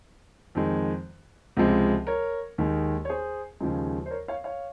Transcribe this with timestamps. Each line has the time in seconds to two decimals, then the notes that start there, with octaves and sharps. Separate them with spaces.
0.55 F2 D#3 G#3
1.57 C#2 C3 F3 G#3
2.07 A#4 C#5
2.58 D#2 D#3 G#3
3.05 C#5
3.09 G#4 C5
3.60 D#2 C#3 F3 G#3
4.06 C5
4.10 A#4 C#5
4.28 C#5 F5
4.44 C#5 F5